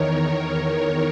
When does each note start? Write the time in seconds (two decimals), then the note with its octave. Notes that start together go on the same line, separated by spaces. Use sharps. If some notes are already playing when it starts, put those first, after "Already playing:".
Already playing: E2 D#3 A#4 C#5
0.19 A#4